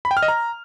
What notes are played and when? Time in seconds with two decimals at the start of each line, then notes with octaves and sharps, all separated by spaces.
0.05 B5
0.11 G5
0.17 F6
0.23 D#5
0.28 A#5